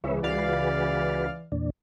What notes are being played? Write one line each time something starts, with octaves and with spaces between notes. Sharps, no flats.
C#2 C#3 E3 B4 C#5 E5
C#2 F#4 G#4 B4 D5 F5
E2 A#2 D4